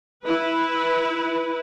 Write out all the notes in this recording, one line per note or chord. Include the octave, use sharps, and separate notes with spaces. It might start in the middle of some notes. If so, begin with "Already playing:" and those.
E4 B4